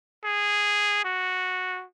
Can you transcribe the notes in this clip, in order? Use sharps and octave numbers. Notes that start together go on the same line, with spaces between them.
G#4
F#4